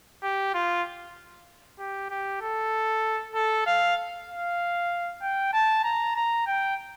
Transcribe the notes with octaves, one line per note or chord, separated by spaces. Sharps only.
G4
F4
G4
G4
A4
A4
F5
F5
G5
A5
A#5
A#5
G5